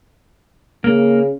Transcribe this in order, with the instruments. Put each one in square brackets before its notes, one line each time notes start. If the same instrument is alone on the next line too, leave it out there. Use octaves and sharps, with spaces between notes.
[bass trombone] C#3 [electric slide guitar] A#3